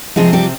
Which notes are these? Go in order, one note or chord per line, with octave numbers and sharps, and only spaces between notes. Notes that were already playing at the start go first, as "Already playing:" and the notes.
C3 F3 G#3 C4 G#4
G3 G4